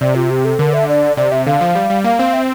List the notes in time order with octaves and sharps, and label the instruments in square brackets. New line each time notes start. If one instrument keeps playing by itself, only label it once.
[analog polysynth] C3 [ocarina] D5
[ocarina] F4
G4
A4
[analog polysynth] D3 [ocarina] A#4
[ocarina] E5
D5
[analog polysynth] C3 [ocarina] D5
[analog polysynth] C3 [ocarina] E5
[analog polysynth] D3 [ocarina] F5
[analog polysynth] F3
G3
G3
[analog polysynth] A#3 [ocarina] F5
[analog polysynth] C4
[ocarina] E5